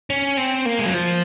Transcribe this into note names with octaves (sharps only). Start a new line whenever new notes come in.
C#4
C4
A#3
G#3
F#3
F3